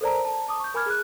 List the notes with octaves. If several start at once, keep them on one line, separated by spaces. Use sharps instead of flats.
A4 A#4 C5 D5 A5 A#5
A5
A5 D6 D#6
C#6 G6
A#4 G#5 B5 D6 F6 G#6
G#4 F#6